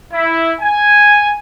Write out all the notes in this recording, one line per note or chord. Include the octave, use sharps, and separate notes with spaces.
E4
G#5